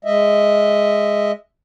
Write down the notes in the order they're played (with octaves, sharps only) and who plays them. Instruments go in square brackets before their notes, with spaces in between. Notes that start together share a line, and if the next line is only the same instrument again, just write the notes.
[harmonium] G#3 D#5 E5